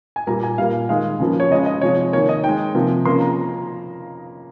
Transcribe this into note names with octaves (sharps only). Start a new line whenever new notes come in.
G#5
A#2 G3 A#3 A#5
G#5
A#2 G3 A#3 F5
D#3 G#3 F5
C#3 F3 A#3
C#5
C#3 G#3 D#5
D#5
C3 F3 G#3 C#5
D#3 A#3 C#5
D#5
D#3 G#3 G5
C3 F3 A#3
C#3 F3 A#3 C6
A#5